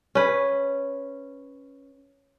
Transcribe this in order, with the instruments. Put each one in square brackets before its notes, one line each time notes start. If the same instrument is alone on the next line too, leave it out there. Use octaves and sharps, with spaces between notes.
[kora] C#4 B4